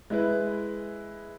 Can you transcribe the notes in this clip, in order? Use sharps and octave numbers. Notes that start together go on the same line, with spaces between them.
G#3 E4 B4